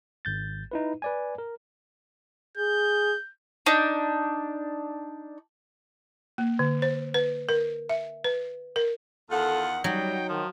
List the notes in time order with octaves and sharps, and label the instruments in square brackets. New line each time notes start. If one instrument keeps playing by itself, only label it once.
[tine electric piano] G#1 G6 A6
D#4 E4 B4
B4 D5 G#5
A#4
[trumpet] G#4 [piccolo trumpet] G6
[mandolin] D4 D#4
[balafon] A#3
D3
C5
B4
A#4
E5
B4
A#4
[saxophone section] E2 D#3 F#5 [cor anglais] F4 [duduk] A4
[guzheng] F#3 [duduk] G3 [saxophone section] D#4 [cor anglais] G5
[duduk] D#3 [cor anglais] F3